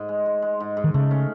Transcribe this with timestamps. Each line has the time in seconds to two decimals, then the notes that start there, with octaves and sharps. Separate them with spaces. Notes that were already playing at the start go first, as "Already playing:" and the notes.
Already playing: G#2
0.09 G#3
0.26 G#3
0.42 G#3
0.60 G#2
0.77 G#2
0.84 D#3
0.94 C#3 A3
1.11 C#4